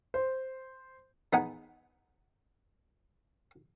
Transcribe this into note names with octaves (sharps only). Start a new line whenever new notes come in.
C5
E2 B3 D#4 F#5 G#5